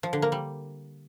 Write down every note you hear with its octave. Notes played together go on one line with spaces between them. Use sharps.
F3
D3
A#3
G3